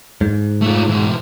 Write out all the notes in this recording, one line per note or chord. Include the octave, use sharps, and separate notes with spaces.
G#2
A3 F4
E3 G#3